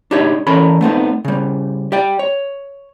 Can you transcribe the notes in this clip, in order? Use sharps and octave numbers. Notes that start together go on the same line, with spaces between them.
D4 D#4 G4 C#5
E3 C#4 A4 A#4 B5
A3 B3 C4 D#4
C#3 G3
G4 D5 G5
C#5